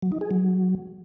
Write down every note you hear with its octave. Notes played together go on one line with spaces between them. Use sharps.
F#3
D#4
G#4
F#3